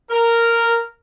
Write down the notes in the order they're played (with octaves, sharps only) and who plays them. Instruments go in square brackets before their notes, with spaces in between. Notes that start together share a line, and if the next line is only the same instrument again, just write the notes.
[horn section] A#4